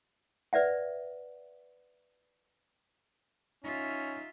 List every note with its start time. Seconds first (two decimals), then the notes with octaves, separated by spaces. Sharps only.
0.53 B4 D5 E5 F#5
3.64 C#4 D#4 F4 E5